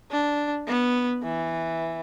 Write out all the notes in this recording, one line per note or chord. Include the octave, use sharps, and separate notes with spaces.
D4
B3
E3